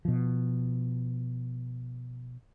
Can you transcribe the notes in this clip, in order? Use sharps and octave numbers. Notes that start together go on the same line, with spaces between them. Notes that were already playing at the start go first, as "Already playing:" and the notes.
B2 F3